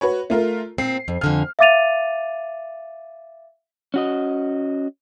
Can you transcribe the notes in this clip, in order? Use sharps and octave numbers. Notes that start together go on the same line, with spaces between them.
F#4 B4 C#5
A3 F4 A#4
A#2 C4 C7
F2
F2 D3 G#5 F6
E5 F5 D6 A6 D#7 F7
C#4 F#4 D#5